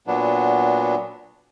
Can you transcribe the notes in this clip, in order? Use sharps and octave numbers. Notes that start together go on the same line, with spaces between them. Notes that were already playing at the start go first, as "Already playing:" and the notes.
A#2 F#3 B3 D4